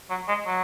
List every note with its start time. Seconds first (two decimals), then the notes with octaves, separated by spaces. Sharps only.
0.10 F#3
0.28 G#3
0.47 F#3